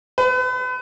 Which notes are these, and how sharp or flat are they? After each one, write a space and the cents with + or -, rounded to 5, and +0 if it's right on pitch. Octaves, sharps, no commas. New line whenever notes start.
B4 +35